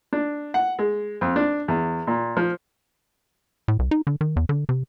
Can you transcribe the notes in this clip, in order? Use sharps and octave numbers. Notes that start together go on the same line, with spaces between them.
D4
F#5
G#3
F2
D4
E2
A#2
F3
A2
C2
D#4
D3
D#3
E2
D3
C3